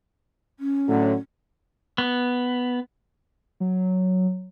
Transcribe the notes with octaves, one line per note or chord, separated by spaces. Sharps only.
C#4
A2 D3 F#3
B3
F#3